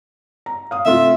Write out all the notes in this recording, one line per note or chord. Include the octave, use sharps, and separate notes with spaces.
A#5
F5 D#6
C3 A3 F4 E5